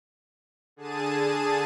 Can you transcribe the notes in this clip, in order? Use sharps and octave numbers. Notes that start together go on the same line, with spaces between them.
D3 G#4 A5 D#7